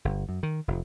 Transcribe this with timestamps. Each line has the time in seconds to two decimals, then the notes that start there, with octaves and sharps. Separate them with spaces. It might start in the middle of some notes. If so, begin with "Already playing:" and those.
0.05 G1
0.29 F#2
0.43 D#3
0.68 F1